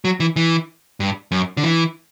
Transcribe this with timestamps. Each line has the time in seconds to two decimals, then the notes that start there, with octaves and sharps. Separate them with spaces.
0.05 F#3
0.20 E3
0.36 E3
1.00 G2
1.32 F#2
1.57 D3
1.64 E3